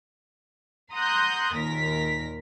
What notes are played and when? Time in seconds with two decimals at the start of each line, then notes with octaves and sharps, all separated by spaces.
0.92 F#5 A#5 C6 D#6 F#6 G6
1.55 D#2 A#2 A#4 A#6 B6